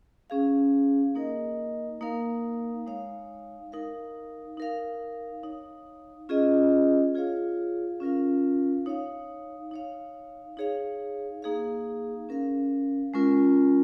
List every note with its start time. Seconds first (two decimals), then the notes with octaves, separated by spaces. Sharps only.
0.30 C#4 G#4 F5
1.15 A#3 D#4 A#4 D#5
2.01 A#3 D#4 A#4 F5
2.86 G#3 D#4 C#5 F5
3.72 D#4 A#4 F5
4.57 D#4 A#4 F5
5.43 D#4 C#5 F5
6.29 C#4 F4 G#4 D#5
7.15 F4 G#4 C#5 F5
8.00 C#4 F4 A#4 F5
8.86 D#4 C#5 F5
9.71 D#4 C#5 F5
10.57 D#4 G#4 C#5 F5
11.42 A#3 D#4 G#4 F5
12.29 C#4 A#4 F5
13.14 G#3 C#4 F4 A#4